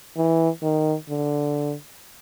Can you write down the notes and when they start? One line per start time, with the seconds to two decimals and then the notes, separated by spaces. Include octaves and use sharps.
0.17 E3
0.63 D#3
1.09 D3